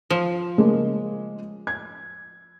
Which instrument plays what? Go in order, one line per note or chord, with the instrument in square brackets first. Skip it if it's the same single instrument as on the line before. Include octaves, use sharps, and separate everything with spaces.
[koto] F3
[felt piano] C#3 G#3 A#3
G#6